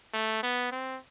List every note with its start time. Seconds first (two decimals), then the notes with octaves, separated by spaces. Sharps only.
0.13 A3
0.43 B3
0.72 C4